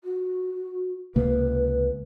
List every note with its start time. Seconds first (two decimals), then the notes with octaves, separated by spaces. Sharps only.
0.04 F#4
1.16 C#2 C3 A#3 B4